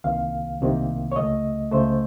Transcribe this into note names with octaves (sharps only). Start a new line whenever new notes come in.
C2 C3 D#3 A#3 F5
C2 C3 D#3 A#3
C#5
C#2 C#3 A3 D#5
C#2 C#3 A3 C5